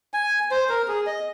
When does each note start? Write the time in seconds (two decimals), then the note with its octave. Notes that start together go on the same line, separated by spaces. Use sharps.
0.14 G#5
0.51 C5
0.69 A#4
0.88 G#4
1.06 D#5